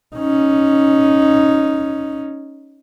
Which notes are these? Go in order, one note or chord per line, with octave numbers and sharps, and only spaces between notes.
C#4 D#4